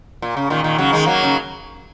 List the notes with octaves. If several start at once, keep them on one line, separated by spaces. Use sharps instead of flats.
A#2
C#3
A#2 D#3
A#2 D#3
C#3 F#3
D#3 G#3
F#3 A#3
C#3